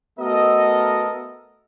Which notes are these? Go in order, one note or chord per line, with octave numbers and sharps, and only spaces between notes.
A3 B3 F#4 A4 A#4 D#5